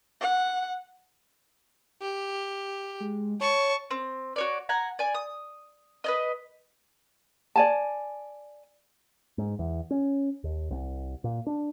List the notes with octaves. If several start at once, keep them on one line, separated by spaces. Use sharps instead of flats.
F#5
G4
G#3
C#5 A5 C#6
C4
F#4 C#5 D5
F#5 G#5 A#5
D5 G#5
D#6
B4 D5 D#5
D5 G#5 A5
G#2
E2
C#4
D#2
C2
A#2
D4